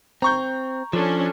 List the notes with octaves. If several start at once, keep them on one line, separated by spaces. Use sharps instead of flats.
C4 A#5 C#6 G6
F3 C#4 D4 A4